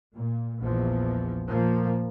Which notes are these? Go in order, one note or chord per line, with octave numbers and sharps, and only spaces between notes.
A#2
A#1 E2 F3
A#2 F3 A#3